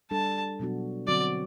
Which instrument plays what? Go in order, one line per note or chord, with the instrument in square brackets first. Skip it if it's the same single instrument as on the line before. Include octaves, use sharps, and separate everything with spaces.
[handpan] G3 D4 A4 [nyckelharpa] A5
[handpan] B2 F#3 B3 D4 F#4
[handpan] D3 F#3 C4 F#4 [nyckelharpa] D5